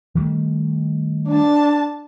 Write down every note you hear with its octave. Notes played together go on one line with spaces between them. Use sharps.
D#3 G3 A3
D4 A5